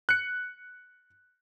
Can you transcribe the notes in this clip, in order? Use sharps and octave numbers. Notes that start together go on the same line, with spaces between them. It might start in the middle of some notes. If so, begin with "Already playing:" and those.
F#6 C#7